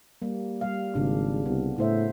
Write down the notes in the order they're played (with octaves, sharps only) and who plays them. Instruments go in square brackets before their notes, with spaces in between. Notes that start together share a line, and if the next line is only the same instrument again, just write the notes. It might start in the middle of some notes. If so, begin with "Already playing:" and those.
[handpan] G3 A#3
G3 F5
[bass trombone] G#1 [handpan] C#3 D4
[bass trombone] C2 [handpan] B3
[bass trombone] A2 [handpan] E4 C5 E5